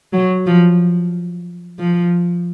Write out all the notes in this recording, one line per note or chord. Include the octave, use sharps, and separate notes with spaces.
F#3
F3
F3